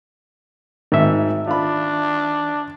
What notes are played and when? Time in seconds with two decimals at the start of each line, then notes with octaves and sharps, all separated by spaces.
0.92 G#1 G#2 D#3 E5
1.47 D4 F4 B5